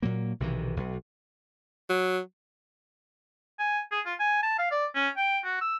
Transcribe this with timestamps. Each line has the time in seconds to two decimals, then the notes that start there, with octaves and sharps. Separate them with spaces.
0.03 A#2 F#3 A#3
0.40 B1 C3 D#3 E3
0.76 B1
1.89 F#3
3.59 G#5
3.91 G#4
4.06 F4
4.20 G#5
4.43 A5
4.59 F5
4.71 D5
4.95 C#4
5.17 G5
5.44 F#4
5.61 E6